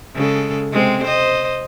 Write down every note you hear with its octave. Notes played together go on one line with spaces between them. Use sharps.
C#3 G#3 A4
C3 G#3 C4
C5 D#5